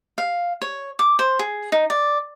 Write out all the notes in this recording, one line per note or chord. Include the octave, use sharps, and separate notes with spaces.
F5
C#5
D6
C5
G#4
D#4
D5